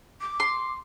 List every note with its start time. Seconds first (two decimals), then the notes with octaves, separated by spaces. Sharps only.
0.21 D6
0.40 C6